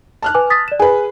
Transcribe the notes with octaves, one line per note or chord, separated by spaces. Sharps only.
A5 F6 F#6
B4 G#5 D6
D#6 A6 B6
D5 E7
G#4 B4 G#5